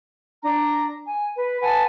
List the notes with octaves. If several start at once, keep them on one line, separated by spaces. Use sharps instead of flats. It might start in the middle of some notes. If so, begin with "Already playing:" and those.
D4 A#5
G#5
B4
B4 F#5 G#5 A5